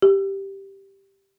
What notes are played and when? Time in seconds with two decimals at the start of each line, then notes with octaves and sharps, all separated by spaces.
0.02 G4